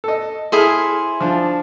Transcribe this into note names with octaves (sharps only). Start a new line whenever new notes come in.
A4 D#5
E4 G#4 A4 C5 F6
F3 D4 F4